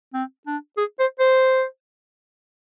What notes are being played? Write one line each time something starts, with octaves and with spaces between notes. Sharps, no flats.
C4
D4
G#4
C5
C5